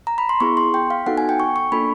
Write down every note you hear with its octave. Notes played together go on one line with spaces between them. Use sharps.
A#5
B5
C6
B3 E4 G#4 C#6
C6
G5
F5
B3 D#4 F#4 A4 F#5
G#5
G5
C#6
C#6
A#3 D4 F4 A4 B5